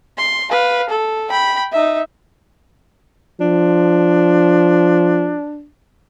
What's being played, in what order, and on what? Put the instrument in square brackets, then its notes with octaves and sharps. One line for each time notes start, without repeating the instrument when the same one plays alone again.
[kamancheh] C6
B4 F5
A4
G5 B5
D#4 E5
[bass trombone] F3 [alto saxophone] D4